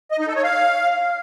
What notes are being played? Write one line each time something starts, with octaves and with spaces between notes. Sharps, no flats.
D#5
D#4
A4
C#5
F5